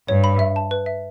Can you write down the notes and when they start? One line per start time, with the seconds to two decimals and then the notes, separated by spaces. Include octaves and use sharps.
0.08 G2 C#5
0.24 B5
0.39 E5
0.56 A5
0.71 B4
0.86 E5